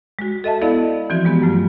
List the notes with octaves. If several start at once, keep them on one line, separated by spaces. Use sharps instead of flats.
G#3 F#4
A4 D#5 E5 A5
B3 E4 A4 D5 D#5 F5
E3 F3 C4 F#4
G#3 B3 G4
G2 F#3 A3 F4